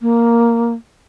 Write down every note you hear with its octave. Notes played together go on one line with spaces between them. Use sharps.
A#3